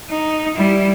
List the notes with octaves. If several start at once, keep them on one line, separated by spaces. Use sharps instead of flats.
D#4
G3 E4